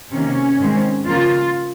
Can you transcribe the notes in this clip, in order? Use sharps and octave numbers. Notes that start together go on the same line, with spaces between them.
C3 D#3 A#3 C#4
G#2 D#3 G#3 C4
C#3 F3 A#3 F4